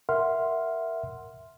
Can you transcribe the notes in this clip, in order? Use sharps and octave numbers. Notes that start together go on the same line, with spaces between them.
A#4 E5 F#5 C6 F6